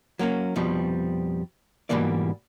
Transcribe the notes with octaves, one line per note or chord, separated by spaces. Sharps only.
F#3 A#3 C4 C#4
F2 B2 F3 G3
G#2 B2 E3 G3 A#3 D5